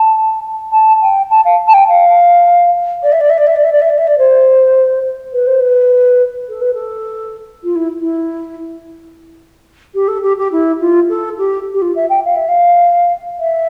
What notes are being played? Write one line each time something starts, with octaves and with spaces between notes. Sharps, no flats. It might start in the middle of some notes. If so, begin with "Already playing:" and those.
Already playing: A5
A5
G5
A5
F5
A5
G5
F5
D5
E5
D5
E5
D5
E5
D5
E5
D5
E5
D5
E5
D5
C5
B4
C5
B4
A4
B4
A4
F4
E4
E4
G4
A4
G4
G4
E4
F4
A4
G4
G4
F4
E5
G5
F5
E5
F5
E5